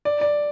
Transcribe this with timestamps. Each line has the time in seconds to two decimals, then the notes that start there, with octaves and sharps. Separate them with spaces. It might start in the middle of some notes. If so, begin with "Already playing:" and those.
0.05 D5
0.21 D5